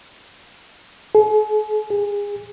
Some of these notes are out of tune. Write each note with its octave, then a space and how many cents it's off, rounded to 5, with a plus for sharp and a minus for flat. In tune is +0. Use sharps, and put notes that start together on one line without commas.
G#4 +45
G#4 -25